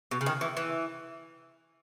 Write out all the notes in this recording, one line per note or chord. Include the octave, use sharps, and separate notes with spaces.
B2
C#3
D#3
E3
E3